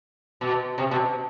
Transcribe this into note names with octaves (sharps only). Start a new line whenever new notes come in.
B2
C3
B2